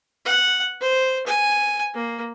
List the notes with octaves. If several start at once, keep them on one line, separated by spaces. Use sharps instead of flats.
F#5
C5
G#5
A#3